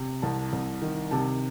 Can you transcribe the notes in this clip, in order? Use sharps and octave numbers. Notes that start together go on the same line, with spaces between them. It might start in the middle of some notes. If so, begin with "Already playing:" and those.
Already playing: C3
C2 A5
C2
D#3
C3 A5